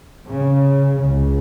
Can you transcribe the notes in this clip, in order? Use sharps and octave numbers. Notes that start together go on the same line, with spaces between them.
C#3
C#2 C#3